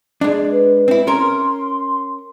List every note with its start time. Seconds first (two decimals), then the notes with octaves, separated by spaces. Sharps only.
0.21 G#3 D4
0.51 B4
0.88 C4 E4
1.07 C#4 A#4 C6